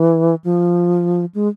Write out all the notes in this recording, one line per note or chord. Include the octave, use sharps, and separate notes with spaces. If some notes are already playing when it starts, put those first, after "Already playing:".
Already playing: E3
F3
G#3